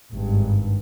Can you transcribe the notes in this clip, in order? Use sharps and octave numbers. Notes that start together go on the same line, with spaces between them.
G#1 G2